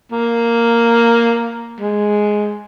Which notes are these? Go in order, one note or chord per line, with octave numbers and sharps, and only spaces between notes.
A#3
G#3